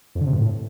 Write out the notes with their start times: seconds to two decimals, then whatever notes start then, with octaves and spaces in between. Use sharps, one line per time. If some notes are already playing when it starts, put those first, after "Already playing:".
0.15 F2
0.21 D3
0.27 C3
0.32 G2
0.38 A2